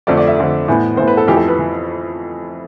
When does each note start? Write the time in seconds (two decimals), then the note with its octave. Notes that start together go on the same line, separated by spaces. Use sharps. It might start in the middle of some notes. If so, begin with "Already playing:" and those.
0.07 F2 D3 A3 D5
0.17 D5
0.27 E5
0.38 F2 D3 A3
0.68 A2 E3 B3
0.97 A2 E3 B3 C5
1.08 B4
1.17 A4
1.28 F2 E3 A3 G4
1.37 A4
1.48 B4
1.59 E3